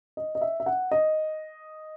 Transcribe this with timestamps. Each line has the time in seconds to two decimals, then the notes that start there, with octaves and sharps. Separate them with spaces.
0.17 D#5
0.35 D#5
0.41 E5
0.60 E5
0.66 F#5
0.91 D#5